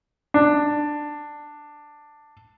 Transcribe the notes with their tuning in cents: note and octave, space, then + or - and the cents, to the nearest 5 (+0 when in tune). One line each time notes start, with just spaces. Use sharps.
D4 +10